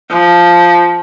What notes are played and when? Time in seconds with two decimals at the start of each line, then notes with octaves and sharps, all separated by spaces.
0.11 F3